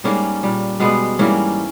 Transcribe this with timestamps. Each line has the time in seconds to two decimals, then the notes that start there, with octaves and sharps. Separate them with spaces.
0.04 G#2 G3 A#3 C#4
0.43 A#2 G3
0.80 B2 G3 G#3 B3
1.19 G#2 E3 G3 A#3 C#4